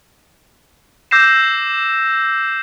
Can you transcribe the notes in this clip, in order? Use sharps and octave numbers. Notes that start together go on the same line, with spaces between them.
D6 E6 G6 A#6 C7 E7